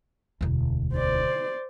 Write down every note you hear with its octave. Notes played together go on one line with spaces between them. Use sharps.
E1 D2
C5 D5